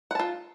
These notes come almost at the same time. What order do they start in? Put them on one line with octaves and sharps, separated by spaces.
F#5 A5 F4